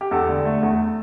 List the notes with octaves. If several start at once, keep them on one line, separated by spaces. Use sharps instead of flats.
G4
E2 A4
D3
A3
E2